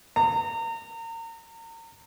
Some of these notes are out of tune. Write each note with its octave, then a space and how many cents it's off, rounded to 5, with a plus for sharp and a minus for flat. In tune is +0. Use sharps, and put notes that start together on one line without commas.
A#5 -35